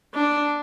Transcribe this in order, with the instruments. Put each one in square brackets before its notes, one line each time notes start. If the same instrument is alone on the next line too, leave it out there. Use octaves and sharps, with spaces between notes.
[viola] D4